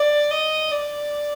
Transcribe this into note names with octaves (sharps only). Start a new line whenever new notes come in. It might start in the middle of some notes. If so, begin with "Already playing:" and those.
Already playing: D5
D#5
D5